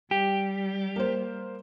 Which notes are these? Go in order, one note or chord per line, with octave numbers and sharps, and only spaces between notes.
G3 G4
A#3 C5